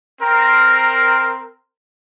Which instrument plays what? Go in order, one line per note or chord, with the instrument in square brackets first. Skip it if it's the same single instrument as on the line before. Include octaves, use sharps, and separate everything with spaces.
[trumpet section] C4 A#4